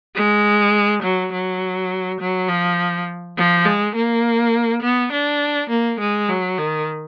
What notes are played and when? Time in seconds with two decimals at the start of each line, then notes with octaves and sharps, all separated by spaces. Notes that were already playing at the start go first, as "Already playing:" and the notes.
0.15 G#3
1.02 F#3
1.32 F#3
2.20 F#3
2.48 F3
3.37 F3
3.65 G#3
3.95 A#3
4.82 B3
5.12 D4
5.70 A#3
6.00 G#3
6.29 F#3
6.58 D#3